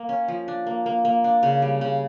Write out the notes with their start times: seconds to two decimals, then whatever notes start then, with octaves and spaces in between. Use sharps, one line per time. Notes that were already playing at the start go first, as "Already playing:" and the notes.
Already playing: A#3
0.09 C#4
0.28 F3
0.48 D4
0.66 A#3
0.86 A#3
1.05 A#3
1.24 D4
1.43 C#3
1.62 G3
1.81 C#3